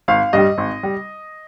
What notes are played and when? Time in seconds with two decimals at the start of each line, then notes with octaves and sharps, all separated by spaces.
0.08 G#1 F5
0.33 G2 G3 D#5
0.58 G#1
0.83 G3